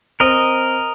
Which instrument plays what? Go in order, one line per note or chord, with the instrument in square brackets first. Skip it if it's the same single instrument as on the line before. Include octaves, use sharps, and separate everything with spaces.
[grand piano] C4 [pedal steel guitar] A#4 D#5